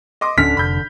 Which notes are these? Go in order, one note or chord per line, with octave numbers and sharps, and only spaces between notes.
D#5 C6 D6
D1 D3 C#4 D4 F6 B6
F1 B5 G6